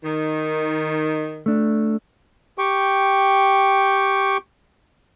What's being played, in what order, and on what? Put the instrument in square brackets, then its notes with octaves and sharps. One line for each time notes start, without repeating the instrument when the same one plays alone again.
[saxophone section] D#3
[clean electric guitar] A3 D4
[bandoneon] G4 G5 C#6